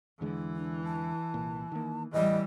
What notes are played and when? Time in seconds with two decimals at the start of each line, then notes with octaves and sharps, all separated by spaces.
0.21 E2 D3 E3 G#3
0.55 D4
0.85 A5
1.34 C2 A#2
1.72 D#3 A#3
2.13 A1 E2 E3 G3 D#5